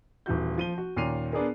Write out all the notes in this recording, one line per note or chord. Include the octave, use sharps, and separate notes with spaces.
D#1 E3 F#4 G6
F3 D#7 G7
F#4
D#2 A#2 C#4 C7 D#7 F7
B3 D4 G#4 A#4